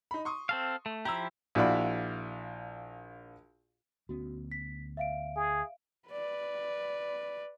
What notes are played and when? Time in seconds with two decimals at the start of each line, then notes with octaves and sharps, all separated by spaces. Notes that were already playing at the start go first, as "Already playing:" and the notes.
0.11 D#4 B5
0.25 C6 C#6 D#6
0.49 C4 A4 F5
0.86 A3
1.05 F3 E4 G4 A#5 E6
1.55 A#1 E4 F#4 D5 F5 B5
4.09 D2 B3 C#4 F#4
4.52 B6
4.97 E5 F5 D7
5.37 G#4
6.08 B4 D5